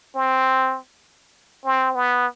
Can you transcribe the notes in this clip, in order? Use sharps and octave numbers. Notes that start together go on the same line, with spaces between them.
C4
C4
B3